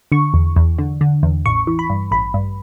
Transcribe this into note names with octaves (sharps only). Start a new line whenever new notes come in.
D3 C#6
E2
E2
D3
D3
E2
A1 C#6
E3
B5
G2
A1 B5
G2